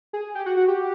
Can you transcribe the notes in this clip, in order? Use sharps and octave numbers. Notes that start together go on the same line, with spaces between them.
G#4
G4
F#4
F#4
G4